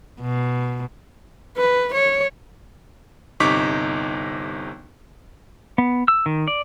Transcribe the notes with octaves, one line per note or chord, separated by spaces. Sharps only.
B2
B4
C#5
G1 C3 D#4 C#6 D6 B6
B3
E6
D#3
D5